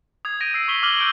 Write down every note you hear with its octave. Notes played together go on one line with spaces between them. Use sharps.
D#6 G#6
D#6 G6 G#6 A#6 D7 D#7
E6 C7
C#6 D#6 B6 F#7 G7
D6 F6 F#7 G7
E6 G6 D7 D#7 F#7